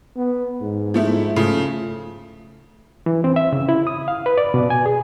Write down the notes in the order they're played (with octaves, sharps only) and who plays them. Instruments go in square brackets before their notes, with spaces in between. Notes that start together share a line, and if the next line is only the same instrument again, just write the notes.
[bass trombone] B3
G#2
[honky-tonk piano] F3 A3 E4
[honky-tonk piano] C#3 F3 [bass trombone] A3
[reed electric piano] E3
C4
E5
C#3
E4
D#6
F5
B4
D5
B2
G#5
G#4